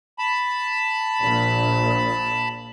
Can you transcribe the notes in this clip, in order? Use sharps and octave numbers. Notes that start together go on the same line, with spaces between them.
A5 B5
A#1 A#2